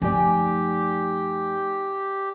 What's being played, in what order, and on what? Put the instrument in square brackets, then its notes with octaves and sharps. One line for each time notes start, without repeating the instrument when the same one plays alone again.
[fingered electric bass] F#2 F3 A3 [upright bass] D#4 [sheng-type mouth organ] G4 [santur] D5 G#5